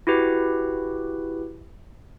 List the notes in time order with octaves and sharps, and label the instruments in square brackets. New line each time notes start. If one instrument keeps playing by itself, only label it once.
[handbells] E4 F#4 G4 B4